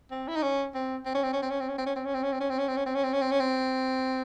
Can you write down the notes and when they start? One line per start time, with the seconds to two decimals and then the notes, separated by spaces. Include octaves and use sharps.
0.11 C4
0.28 E4
0.36 D#4
0.42 C#4
0.75 C4
1.06 C4
1.15 C#4
1.23 C4
1.33 C#4
1.42 C4
1.50 C#4
1.60 C4
1.69 C#4
1.78 C4
1.86 C#4
1.96 C4
2.05 C#4
2.14 C4
2.23 C#4
2.32 C4
2.40 C#4
2.50 C4
2.59 C#4
2.68 C4
2.77 C#4
2.86 C4
2.95 C#4
3.04 C4
3.13 C#4
3.22 C4
3.31 C#4
3.40 C4